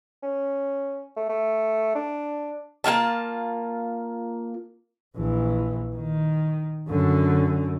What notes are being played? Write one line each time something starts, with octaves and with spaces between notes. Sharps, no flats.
C#4
A3
A3
D4
A#3 E4 F4 A5
A#1 E3
D#3
F#2 D3